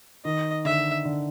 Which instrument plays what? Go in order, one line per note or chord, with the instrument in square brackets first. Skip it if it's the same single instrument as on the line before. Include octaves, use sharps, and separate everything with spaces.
[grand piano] D#3 [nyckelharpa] D#5
[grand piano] D3 [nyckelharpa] E5
[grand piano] D3